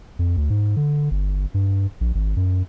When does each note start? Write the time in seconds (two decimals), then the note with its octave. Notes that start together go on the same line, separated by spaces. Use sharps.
0.19 F2
0.37 D2
0.50 G#2
0.76 D3
1.11 G1
1.54 G2
2.01 A#1
2.15 G#1
2.36 F#2